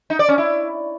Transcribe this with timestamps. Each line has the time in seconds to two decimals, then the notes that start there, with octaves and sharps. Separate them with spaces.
0.10 D#4
0.19 D5
0.29 C#4
0.38 E4